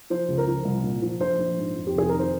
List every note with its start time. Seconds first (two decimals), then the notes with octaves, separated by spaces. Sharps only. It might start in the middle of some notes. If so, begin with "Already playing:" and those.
0.10 F3 C5
0.28 C#2
0.38 A#4
0.47 F3
0.65 C2
0.83 A#2
1.02 F3
1.20 A#1 C5
1.39 A#1
1.57 G#2
1.75 F2
1.87 G4
1.94 F1 G#4
2.09 D#3 A#4
2.19 C5